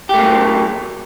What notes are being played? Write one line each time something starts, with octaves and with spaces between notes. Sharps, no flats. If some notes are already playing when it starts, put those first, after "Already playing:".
F#3 A3 A#3 G4